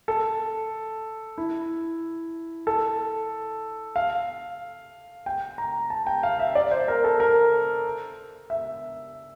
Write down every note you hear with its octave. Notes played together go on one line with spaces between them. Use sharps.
A4
E4
A4
F5
G5
A#5
A5
G5
F5
E5
D5
C5
A#4
A4
A#4
E5